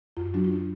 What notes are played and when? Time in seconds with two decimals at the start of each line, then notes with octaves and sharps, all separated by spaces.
0.17 F#2 F4
0.34 F#3 D4 F#4
0.44 F4
0.52 D4